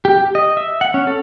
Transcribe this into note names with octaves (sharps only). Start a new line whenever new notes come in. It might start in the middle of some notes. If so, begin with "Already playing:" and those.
G4
D#5
E5
F#5
C#4
A4